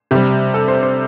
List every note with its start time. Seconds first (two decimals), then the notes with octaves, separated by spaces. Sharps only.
0.11 C3 G3 G4
0.54 A4
0.68 C5
0.82 C5